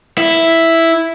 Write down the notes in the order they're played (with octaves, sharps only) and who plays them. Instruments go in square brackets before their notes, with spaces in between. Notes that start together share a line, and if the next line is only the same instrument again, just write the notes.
[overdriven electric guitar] E4